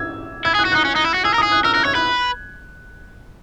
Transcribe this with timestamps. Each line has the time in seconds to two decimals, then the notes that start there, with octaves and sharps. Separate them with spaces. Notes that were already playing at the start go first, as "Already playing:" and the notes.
Already playing: E6 G#6
0.45 E4 G#6
0.55 G#4
0.59 F#6
0.65 F#4
0.72 D#4 F#6
0.85 C#4
0.96 D#4
1.05 E4
1.14 F#4
1.24 G#4 E6
1.34 A#4
1.38 D#6
1.43 G#4
1.52 F#6
1.64 A#4 E6
1.74 A#4 F#6
1.85 C#5 G#6
1.95 B4 F#6